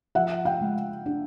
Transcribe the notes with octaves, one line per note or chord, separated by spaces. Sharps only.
F3 E5 F#5
F5 G5
G#3
D4